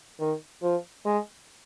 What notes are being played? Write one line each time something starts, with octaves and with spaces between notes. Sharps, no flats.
D#3
F3
G#3